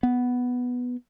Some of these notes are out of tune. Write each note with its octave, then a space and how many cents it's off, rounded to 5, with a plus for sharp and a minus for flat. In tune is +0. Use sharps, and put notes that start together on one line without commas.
B3 +0